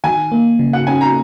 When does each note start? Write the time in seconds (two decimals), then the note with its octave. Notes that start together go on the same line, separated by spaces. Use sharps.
0.04 D#3 G#5
0.32 A#3
0.59 C#3
0.73 F#5
0.87 C#4 G#5
1.01 A#5